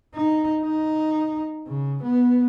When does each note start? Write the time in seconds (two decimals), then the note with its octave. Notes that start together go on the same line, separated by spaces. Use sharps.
0.15 D#4
0.63 D#4
1.67 C#3
2.04 B3